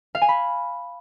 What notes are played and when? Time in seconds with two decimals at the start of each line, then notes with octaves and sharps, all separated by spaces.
0.15 F5
0.22 G#5
0.28 B5